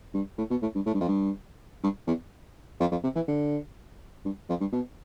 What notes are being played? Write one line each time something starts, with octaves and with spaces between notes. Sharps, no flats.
G2
A2
B2
A2
G2
A2
G2
F2
G2
G2
E2
F2
F2
C3
E3
D3
G2
F2
G2
B2